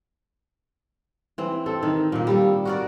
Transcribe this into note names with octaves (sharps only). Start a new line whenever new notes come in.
E3 C4
C4 A4
D#3 D#4
A#2 A#3
G3 A4
F#4 A#4 D5